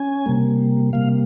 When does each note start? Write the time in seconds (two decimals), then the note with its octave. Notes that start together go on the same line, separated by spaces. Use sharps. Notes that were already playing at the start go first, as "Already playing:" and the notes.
Already playing: C#4 G#5
0.26 C3 G3 A#3
0.93 C3 G3 A#3 F5